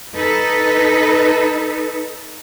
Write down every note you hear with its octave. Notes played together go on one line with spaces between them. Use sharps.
D#4 A4 B4